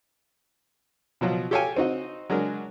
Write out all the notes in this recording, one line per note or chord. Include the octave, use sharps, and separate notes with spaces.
B2 F3 F#3
G4 A4 C#5 F5 G5 G#5
C4 D#4 F#4 D#5
F#3 G#3 D4 A#4